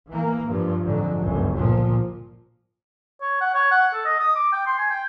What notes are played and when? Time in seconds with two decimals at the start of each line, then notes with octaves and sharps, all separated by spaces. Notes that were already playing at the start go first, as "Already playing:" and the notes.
0.10 E3 A#3
0.48 G2 F3
0.85 F2 G#2 D3 F#3
1.21 G1 C#2 F#2
1.55 A#2 F3
3.21 C#5
3.41 F#5
3.54 C#5
3.71 F#5
3.93 A4
4.05 D#5
4.20 D#6
4.35 D6
4.52 G5
4.66 C6
4.78 G#5
4.90 G5